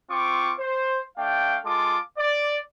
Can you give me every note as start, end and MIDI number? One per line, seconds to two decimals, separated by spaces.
0.10 0.53 60
0.10 0.53 65
0.10 0.53 85
0.10 0.53 86
0.58 1.00 72
1.18 1.57 57
1.18 1.57 62
1.18 1.57 77
1.18 1.57 79
1.64 1.97 56
1.64 1.97 65
1.64 1.97 69
1.64 1.97 86
2.18 2.55 74